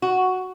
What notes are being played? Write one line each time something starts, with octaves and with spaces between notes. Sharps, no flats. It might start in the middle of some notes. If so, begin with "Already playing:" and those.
F#4